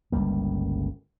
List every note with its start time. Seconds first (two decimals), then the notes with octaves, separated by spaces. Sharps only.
0.12 G1 C#2 G3 A#3